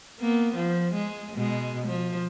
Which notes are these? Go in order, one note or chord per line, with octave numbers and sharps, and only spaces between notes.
A#3 B3
F3
G#3
B2 G#3
F3